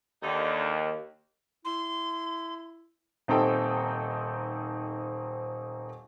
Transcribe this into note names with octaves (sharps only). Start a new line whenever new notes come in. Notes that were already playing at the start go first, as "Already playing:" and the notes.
D#2 D3 D#4
E4 C6
D#1 C4 D#4 A4 G5